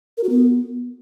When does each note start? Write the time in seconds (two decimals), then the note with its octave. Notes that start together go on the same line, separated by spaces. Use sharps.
0.17 A#4
0.24 F#4
0.30 B3